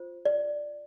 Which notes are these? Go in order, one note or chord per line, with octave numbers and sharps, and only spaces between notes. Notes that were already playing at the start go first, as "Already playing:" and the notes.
Already playing: F4 C5
D5